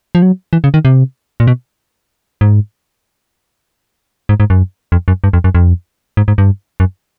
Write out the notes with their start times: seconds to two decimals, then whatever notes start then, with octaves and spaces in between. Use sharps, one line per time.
0.15 F3
0.22 F#3
0.53 E3
0.64 C#3
0.74 D#3
0.85 C3
1.40 A#2
1.47 B2
2.41 G#2
4.29 G#2
4.40 G#2
4.50 F#2
4.92 F2
5.08 F#2
5.24 G2
5.33 F2
5.44 F#2
5.55 F2
6.17 G#2
6.28 G#2
6.38 G2
6.80 F#2